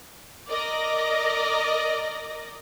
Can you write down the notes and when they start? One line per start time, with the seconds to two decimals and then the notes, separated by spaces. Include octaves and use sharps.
0.49 A#4 D5 D#5 D6 A#6